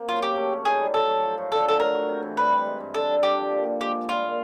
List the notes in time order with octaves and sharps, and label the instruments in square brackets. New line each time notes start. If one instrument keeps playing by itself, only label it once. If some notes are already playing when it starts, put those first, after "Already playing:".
Already playing: [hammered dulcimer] A#3 C4
[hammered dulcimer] F#2 [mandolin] F4
[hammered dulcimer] C#3 [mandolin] G4
[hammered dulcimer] A3
C#4
[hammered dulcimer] D#4 [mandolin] G#4
[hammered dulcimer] G3
[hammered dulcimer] F#3 [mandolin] A4
[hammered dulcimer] F#3
F3
A2
[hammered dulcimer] D3 [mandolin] A4
[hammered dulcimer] D3 [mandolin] A4
[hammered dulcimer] F#3 [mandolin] A#4
[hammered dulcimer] F#4
C3
E3
[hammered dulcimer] G3 [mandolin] B4
[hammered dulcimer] G3
G#3
G2
[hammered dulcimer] D3 [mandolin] A4
[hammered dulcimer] G3
[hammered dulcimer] D4 [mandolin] G4
[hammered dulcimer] F3
A#2
A#2
[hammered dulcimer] G#3 [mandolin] G4
[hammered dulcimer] G#3
[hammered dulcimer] G3 [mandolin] F4
[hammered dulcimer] A#2